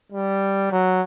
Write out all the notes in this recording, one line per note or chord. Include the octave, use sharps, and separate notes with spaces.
G3
F#3